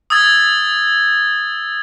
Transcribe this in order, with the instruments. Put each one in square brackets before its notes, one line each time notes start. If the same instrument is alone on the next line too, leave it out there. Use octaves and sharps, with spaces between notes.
[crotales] D#6 E6 G#6 A6